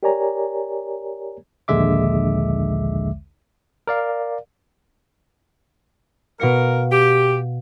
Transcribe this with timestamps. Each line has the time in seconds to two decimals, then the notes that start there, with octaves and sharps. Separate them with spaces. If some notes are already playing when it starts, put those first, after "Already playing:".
0.03 G4 A#4 C#5 D5 G#5 A#5
1.68 A#1 D#2 D3 G#3 E5 D6
3.87 A#4 D5 F5
6.40 B2 A#4 F5 C#7
6.92 G4